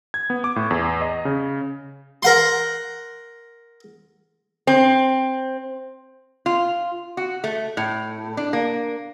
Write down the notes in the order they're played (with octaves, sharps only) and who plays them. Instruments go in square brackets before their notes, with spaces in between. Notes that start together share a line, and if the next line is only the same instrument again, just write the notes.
[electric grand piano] G#6
B3
D6
A2
E2
D#5
C#3
[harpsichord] A#4 F#5 C6
[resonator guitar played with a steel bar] C4
F4
F#4
A3
A2
D4
A#3